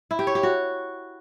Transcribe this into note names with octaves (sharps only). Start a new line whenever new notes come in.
E4
G4
C#5
G4
F#4